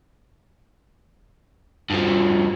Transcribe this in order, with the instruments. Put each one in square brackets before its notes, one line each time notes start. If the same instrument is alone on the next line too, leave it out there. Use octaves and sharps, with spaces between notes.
[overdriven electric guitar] G2 F3